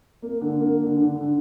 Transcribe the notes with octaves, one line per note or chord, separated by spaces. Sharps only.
A#3
D3
A#3
D3
D3
D3